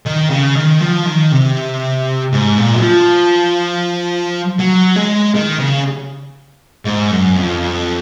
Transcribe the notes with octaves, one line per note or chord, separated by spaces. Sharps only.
D#3
C#3
D#3
F3
D#3
C3
G#2
A#2
F#3
F3
F#3
G#3
D#3
C#3
G#2
F#2
F2